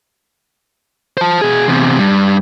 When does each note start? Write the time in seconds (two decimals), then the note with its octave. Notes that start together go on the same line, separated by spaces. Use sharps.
1.17 C5 A5
1.41 B2 G#4
1.68 E2 C3
1.99 G2